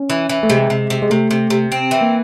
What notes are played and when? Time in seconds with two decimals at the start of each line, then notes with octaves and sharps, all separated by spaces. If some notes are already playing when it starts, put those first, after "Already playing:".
Already playing: C#4
0.10 E3
0.29 E3
0.43 A3
0.50 C3 G#3
0.70 C3
0.90 C3
1.02 G#3
1.10 C3 A3
1.31 C3
1.50 C3
1.72 C4
1.91 E3
2.01 A#3